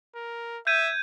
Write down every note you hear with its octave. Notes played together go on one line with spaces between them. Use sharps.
A#4
E5 G6 G#6 D#7